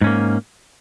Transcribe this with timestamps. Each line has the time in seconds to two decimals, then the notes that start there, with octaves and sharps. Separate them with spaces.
0.01 G#2
0.04 C#4
0.07 A#3